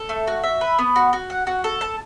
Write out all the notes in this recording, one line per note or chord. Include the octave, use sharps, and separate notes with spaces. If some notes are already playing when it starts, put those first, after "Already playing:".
Already playing: A4
A3
F#4
E5
B4
B3
F#4
F#4
F#5
F#4
A4
A5